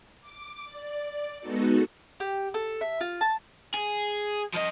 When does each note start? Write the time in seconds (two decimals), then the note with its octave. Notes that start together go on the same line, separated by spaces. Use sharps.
0.21 D6
0.64 D5
1.40 G#3 B3 D#4 F#4 A4
2.20 G4
2.54 A4
2.81 E5
3.01 F4
3.21 A5
3.74 G#4
4.55 F3 D#5